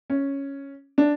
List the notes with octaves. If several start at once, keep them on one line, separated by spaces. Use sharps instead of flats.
C#4
D4